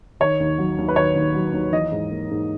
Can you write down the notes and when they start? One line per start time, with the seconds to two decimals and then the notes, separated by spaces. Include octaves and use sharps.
0.20 D#3 C#5
0.40 D#2
0.58 F#3
0.78 D#2
0.88 B4
0.96 D#3 C#5
1.15 D#2
1.34 F#3
1.53 D#2
1.72 E3 D#5
1.92 G#2
2.11 A#3
2.31 G#2